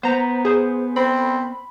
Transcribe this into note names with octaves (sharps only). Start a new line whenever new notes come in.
B3 C5 A#5
G#4 C5
C4 B5